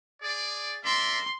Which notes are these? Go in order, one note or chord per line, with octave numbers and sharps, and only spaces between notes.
G#4 D5
A#4 D5 E5 C6